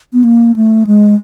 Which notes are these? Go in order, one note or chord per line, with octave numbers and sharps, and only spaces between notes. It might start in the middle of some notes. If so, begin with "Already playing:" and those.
B3
A#3
A3
G#3